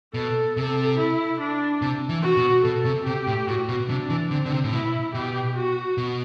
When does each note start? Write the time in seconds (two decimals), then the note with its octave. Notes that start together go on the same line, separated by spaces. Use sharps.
0.14 B2 A4
0.56 C3 A4
0.98 E4
1.40 D4
1.82 C3
2.09 E3
2.23 F#4
2.37 B2
2.65 B2 A4
2.85 C3
3.06 C3 G4
3.27 A2
3.47 A2 F#4
3.69 B2
3.89 C3 D4
4.10 E3
4.31 D3 C4
4.46 D3
4.52 C3
4.64 A2
4.72 B2 E4
5.14 B2 G4
5.56 F#4
5.98 B2